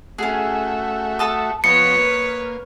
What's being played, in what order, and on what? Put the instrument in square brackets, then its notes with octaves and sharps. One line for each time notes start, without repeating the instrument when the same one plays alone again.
[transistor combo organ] A3 F#4 E5 [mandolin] C#4 G#4
[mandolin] A4 A5 D#6
[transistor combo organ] F3 B3 [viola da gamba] B4 C#5 [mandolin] D#5 [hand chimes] C#7
[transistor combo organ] A#3